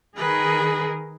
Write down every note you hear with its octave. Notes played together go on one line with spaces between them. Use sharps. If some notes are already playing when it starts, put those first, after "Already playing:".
D#3 G#4 A#4 B4